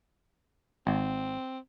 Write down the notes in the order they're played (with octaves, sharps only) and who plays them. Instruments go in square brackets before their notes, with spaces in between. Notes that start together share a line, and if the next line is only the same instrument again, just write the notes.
[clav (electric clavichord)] G#1 [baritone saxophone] C4